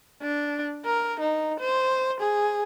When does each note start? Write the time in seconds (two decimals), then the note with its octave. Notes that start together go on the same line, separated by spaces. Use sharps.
0.22 D4
0.85 A#4
1.20 D#4
1.60 C5
2.20 G#4